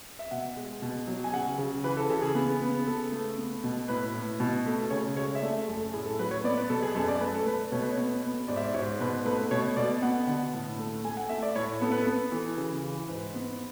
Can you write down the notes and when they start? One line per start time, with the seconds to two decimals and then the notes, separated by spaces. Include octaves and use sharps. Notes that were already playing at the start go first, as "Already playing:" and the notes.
0.19 E5
0.31 B2 F#5
0.56 G#3
0.82 B2
1.07 F#3
1.24 G#5
1.33 C#3 F#5
1.58 C#3
1.84 E3 B4
1.97 A4
2.10 C#3 A4
2.22 G#4
2.35 B3
2.61 B3
2.79 G#4
2.87 C#3 A4
3.12 A3
3.38 B3
3.64 B2
3.88 A2 B4
4.14 A2
4.40 B2
4.66 A3
4.90 C#3 C#5
5.17 G#3 C#5
5.35 E5
5.41 A3 D5
5.68 F#2 A4
5.81 A4
5.93 A2 G#4
6.06 A4
6.19 F#3 B4
6.31 C#5
6.44 B3 D5
6.57 B4
6.70 B2 A4
6.82 G#4
6.95 F#2 A4
7.08 D5
7.20 A3 B4
7.34 A4
7.46 A3 B4
7.72 B2 C#5
7.82 B4
7.92 C#5
7.98 B3
8.23 B3
8.48 G#2 D5
8.56 E5
8.64 D5
8.74 G#2 C#5
9.00 B2 B4
9.25 A3 B4
9.51 B2 C#5
9.77 B2 D5
10.02 B3 F#5
10.27 D3 F#5
10.54 A2
10.78 A3
11.04 A3 G#5
11.17 F#5
11.29 A3 E5
11.43 D5
11.55 A2 C#5
11.81 B3 A4
11.92 B4
12.02 B3 A4
12.32 E3
12.57 C#3
12.83 E3
13.08 G#2 B4
13.35 B3